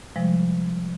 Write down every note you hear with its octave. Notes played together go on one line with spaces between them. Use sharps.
C3 F3 G3 G#3